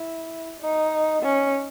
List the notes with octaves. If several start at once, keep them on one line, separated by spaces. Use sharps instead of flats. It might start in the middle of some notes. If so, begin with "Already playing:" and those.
Already playing: E4
D#4
C#4